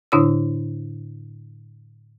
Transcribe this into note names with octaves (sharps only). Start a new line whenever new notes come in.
A2 D3 D4 E4 C#5 E6